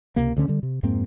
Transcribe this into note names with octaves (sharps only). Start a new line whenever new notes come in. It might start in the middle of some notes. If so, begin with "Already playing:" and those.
C#2 C3 A#3
D2 D3 C#4
D3 G3
C3
F2 G#2 A#3 C4